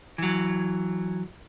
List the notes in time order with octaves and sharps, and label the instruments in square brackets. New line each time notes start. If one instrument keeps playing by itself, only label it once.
[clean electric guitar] E3 F#3